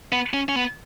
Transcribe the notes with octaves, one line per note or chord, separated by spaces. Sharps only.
B3
C#4
C#4
B3